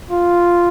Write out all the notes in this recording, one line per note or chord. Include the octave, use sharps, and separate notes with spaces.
F4